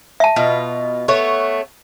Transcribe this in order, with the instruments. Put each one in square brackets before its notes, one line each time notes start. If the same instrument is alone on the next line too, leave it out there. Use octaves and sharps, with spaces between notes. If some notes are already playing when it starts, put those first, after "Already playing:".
[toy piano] E5 A5
[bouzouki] B2 F4
A3 B3 C#5